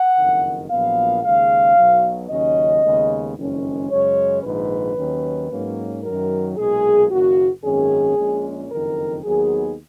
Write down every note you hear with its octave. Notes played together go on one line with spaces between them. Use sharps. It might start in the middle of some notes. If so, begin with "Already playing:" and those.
Already playing: F#5
F#1 F2 D#3
A#1 A#2 F#3 B3 F5
D#2 C#3 G#3 F5
B1 B2 F#3
D#2 C#3 F#3 C#4 D#5
D#2 C#3 G#3 B3
F#1 F2 D#3 G#3 C#4
F#2 C#3 G#3 C#4 C#5
A#1 G#2 D#3 B4
D#2 D#3 F#3 C#4
G#2 F#3 A#3 C#4
F#2 D#3 F#3 A#4
B1 A#2 G#3 G#4
F#1 F#2 D#3 A#3 F#4
G#1 F#2 D#3 A#3 C#4 G#4
A#1 A#2 G#3 C#4
F#1 F2 D#3 A#4
D#2 D#3 F#3 B3 G#4